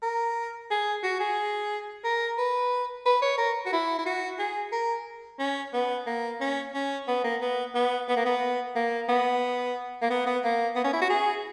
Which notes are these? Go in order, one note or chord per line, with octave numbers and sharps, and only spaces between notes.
A#4
G#4
F#4
G#4
A#4
B4
B4
C#5
A#4
F#4
E4
E4
F#4
G#4
A#4
C#4
B3
A#3
C#4
C#4
B3
A#3
B3
B3
B3
A#3
B3
A#3
B3
A#3
B3
B3
A#3
B3
C#4
E4
F#4
G#4